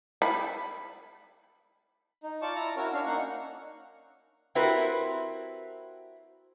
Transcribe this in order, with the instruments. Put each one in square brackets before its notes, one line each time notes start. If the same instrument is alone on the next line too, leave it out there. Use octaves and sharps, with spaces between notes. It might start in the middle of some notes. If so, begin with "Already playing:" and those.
[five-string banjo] B5
[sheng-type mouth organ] D#4
F4 D5 A5 C#6
E4 A#5
C#4 E4 F#4 A#4 C#5
C#4 D4 F5
A#3 D#4 F#5 C#6
[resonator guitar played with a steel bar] C4 E4 F#4 G4 A#4 B4